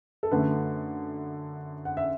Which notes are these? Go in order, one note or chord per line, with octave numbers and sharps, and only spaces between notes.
A4
F#2 D3 A3 B4
F#5
E5